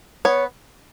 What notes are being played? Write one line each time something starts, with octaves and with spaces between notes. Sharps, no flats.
B3 C#5